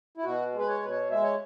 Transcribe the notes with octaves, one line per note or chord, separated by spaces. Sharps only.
E4
B2 F#4
G#3
B4
C#5
B2 B4
C#5
G#3 E5
C#5